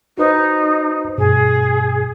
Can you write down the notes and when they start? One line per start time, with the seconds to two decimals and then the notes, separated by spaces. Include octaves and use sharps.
0.18 D#4 F#4 B4 C5
1.18 G2 B2 G#4